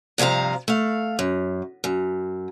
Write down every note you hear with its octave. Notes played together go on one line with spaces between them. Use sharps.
G2 C3 F3 F5 A#5
A3 F5
F#2
F#2